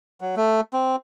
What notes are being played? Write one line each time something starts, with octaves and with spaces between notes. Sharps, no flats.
F#3
A3
C4